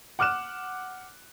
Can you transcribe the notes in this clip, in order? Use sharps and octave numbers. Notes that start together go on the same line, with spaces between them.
F#5 D6 F6 F#6 E7